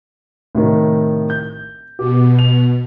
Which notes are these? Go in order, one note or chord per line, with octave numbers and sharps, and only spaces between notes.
A2 C3 D#3
G6
B2 G4
F7